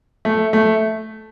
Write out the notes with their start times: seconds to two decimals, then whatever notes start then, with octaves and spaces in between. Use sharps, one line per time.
0.25 A3
0.53 A3